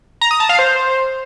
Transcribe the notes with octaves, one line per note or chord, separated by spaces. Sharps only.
A#5
D#6
A5
F5
C5